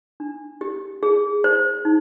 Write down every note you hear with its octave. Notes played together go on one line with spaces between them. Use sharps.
D4
G4
G#4
C5
D#4